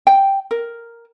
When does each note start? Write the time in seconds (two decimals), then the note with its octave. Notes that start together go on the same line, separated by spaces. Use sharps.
0.07 G5
0.51 A#4